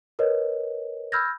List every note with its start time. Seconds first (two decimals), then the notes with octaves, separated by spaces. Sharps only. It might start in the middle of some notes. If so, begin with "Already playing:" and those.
0.19 A#4 B4 C#5 D#5
1.12 B5 E6 F6 G6 G#6 A#6